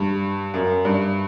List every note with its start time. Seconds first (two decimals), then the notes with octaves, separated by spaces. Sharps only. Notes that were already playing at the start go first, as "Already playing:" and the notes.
Already playing: G2
0.54 F#2
0.85 G2